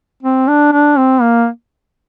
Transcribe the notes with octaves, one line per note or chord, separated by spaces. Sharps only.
C4
D4
D4
C4
A#3